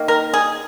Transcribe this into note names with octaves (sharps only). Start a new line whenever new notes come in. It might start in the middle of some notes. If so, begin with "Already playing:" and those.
Already playing: D#3 A#3
A#4
G#4